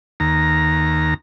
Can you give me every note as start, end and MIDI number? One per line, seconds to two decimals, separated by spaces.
0.20 1.14 39
0.20 1.14 82